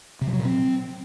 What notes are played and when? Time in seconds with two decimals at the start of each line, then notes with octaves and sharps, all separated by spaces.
0.21 C3
0.27 F3
0.33 F#3
0.39 A#2
0.45 C4